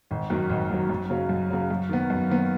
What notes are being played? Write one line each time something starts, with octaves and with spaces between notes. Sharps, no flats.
G#1
F#2 D#3 F#3
G#1
F#2 D#3 F#3
F#2
C#3 F#3
F#2
C#3 F#3
F#2
D#3 B3
F#2
D#3 B3